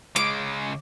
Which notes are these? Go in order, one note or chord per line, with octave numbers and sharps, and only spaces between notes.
C#3 G#3 D6